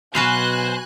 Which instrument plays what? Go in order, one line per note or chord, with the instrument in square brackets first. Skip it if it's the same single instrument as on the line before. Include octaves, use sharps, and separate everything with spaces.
[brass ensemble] B2 F#3 [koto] F#4 B4 F5 [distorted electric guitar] C5 [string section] G#5 F#6